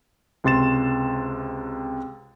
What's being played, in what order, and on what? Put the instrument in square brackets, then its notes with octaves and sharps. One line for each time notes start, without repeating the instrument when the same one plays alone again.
[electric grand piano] C#2 C3 C6 A6 E7